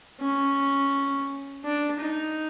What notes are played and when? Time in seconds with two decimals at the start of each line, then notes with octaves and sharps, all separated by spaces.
0.21 C#4
1.65 D4
2.00 D#4